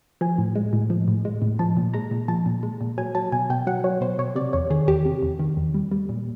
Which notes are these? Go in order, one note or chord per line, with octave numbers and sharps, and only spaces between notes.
F3 G#5
A2
G#3
A2
F3
A2
G#3
A2
F3 A5
A#2
G#3 A#5
A#2
F3 A5
A#2
G#3
A#2
F#3 G#5
F#3 A5
B2 G#5
B2 G5
F#3 F#5
F#3 C#5
B2 C5
B2 C#5
C3 D5
E2 C#5
D#3 G#4
E2 G4
C3
E2
D#3
E2
G3
G3
A#2